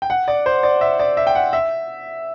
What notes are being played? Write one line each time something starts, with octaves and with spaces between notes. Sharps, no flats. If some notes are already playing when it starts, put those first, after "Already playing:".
G5
F#5
D5
C5
D5
E5
D5
E5
G5
F#5
E5